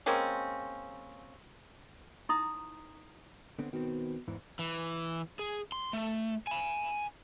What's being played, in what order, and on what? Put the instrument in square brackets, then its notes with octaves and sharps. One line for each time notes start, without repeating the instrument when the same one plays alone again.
[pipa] G#3 A#3 C4 C#4
[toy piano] D#4 E4 A#5 C6 D#6
[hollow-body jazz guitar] D3 B3 C4
[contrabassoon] B2 [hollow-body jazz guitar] D#3 C4
[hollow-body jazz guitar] E2 G#2 E3
[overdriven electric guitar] E3
G#4
C6
A3
G#5 B5